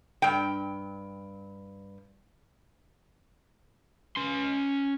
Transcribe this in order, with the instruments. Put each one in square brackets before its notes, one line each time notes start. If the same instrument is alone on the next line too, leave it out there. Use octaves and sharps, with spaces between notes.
[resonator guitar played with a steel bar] G2 G5
[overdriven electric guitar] C#4 C6